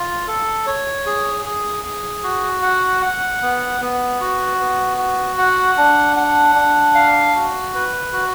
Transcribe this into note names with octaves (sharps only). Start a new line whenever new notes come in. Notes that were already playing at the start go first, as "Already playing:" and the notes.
Already playing: F4
A4
C#5
G#4
G#4
G#4
F#4
F#5
F#5
B3
B3
F#4
B3
F#4
F#5
D4
F#5
D4
F5
F#4
B4
F#4